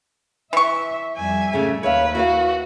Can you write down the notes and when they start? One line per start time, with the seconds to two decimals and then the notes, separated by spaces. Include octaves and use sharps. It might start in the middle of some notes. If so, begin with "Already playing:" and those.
0.53 E3 E5 C#6
1.17 F2 G3 E5 G#5
1.53 G#2 C#3 A3
1.83 D#2 B4 C#5 E5 F5
2.15 E4 F#4 B4 F5